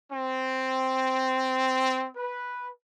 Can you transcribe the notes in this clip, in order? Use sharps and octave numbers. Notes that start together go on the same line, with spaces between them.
C4
B4